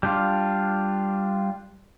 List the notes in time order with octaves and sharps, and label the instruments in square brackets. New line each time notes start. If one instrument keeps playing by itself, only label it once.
[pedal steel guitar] G3 D4 F4